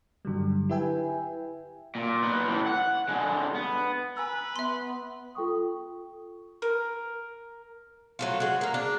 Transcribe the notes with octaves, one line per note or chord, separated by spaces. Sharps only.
G2 D3 F#3 G3
E4 G4 B4 E5 G5 G#5
A#2
B3 D#4
A2 E3
F#5
D3 G#3
B3
B4 G#5 A#5 E6
B3 E5 C6
F4 A4 G5 C#6 D#6
A#4
F#3 A3 F4
G#3 F#4
A#3 A#4
D4